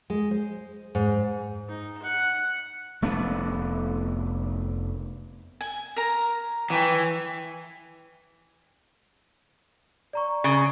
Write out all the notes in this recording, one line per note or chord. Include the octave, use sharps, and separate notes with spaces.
G#3
C5
G#2
D#4
F#5
F1 A3 B3 D4
G#5
A#4 A#5
E3 C#5 G5
D5 A#5 C#6
C#3